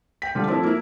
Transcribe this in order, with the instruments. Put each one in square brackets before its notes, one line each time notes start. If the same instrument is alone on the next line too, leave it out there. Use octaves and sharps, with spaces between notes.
[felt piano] G5 B6
D3 F3 G3 F4
F3 A3 C4 E4
A#3 E4